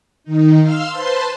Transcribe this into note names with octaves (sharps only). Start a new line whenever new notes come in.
D#3 D#4
F5 C6 E6 F6
B4 C5 A5 C6